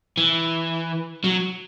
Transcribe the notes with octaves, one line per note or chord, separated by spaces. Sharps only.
E3
F#3